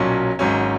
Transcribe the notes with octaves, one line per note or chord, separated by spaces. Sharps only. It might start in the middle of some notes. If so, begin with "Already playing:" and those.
Already playing: B1 A#2 F#3 C#4
G#1 G#2 F#3 C#4